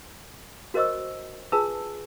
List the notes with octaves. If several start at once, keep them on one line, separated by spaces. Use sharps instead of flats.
F#4 A#4 C5 D#5 C#6 E6
F4 G#4 B4 G#5 A5 E6